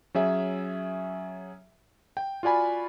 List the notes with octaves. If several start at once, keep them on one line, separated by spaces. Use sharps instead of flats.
F#3 C#4 G#4 E5
G5
F4 F#4 D5 G#5 B5